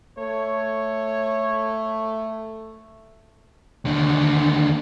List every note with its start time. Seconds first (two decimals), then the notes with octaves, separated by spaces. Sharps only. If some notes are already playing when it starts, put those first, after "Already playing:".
0.18 A3 C#5
3.85 D#2 D3